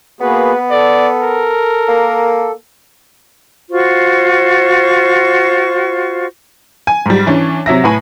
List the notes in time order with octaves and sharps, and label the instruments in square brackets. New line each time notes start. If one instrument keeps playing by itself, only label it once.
[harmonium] A#3 F#4 G#4 [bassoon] B3 [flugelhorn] B4
[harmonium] A4 [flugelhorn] D5
[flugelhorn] A#4
[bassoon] A#3
[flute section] F4 F#4 C5 C#6
[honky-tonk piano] G#5
G#2 G3
E3 C#4 D4
C3 F#3 E5 A#6
A2 B4 G#5 B5